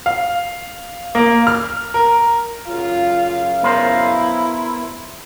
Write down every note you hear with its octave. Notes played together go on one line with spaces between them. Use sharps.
F5
A#3
F6
A#4
F#2 C#3 F4 F5
B3 E4 A#4 C5